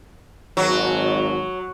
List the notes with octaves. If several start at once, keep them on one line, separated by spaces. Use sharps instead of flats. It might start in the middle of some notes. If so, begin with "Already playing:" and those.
G#1 F#3